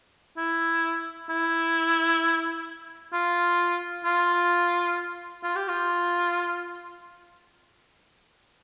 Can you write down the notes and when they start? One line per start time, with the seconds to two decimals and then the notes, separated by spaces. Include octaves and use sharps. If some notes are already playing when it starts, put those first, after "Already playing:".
0.37 E4
1.30 E4
3.13 F4
4.05 F4
5.43 F4
5.56 G4
5.69 F4